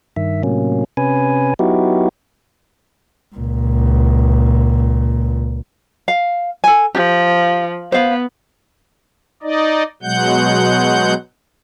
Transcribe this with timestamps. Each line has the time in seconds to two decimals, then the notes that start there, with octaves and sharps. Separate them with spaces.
0.16 G2 D#3 E5
0.43 A2 C3 F#3 A#3 C#4
0.97 C3 C#4 B4 G#5
1.59 F#3 B3 D#4 E4 F#4 G4
3.36 C#2 A#2
6.08 F5
6.64 A4 G#5
6.95 F3 G4
7.92 B3 C5 F5
9.43 D#4 D5 D#5
10.03 B2 F#3 G#3 F#5 G6